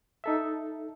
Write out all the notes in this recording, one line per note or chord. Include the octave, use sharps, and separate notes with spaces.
D#4 A4 E5